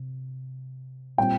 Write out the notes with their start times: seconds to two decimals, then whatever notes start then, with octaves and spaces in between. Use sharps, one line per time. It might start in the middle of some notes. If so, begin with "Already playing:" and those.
Already playing: C3
1.18 A#2 G3 C4 G5